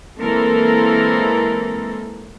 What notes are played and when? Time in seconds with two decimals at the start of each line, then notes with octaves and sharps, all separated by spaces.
0.18 E3 G#3 A#3 C4 A4 A#4